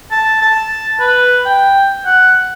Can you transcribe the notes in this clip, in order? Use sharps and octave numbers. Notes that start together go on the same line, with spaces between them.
A5
A5
B4
G5
F#5